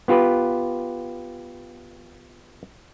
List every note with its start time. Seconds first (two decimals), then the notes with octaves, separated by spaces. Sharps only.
0.08 B3 F4 G4 B4